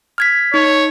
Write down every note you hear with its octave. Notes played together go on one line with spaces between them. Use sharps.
F6 G#6 B6
D#4 C#5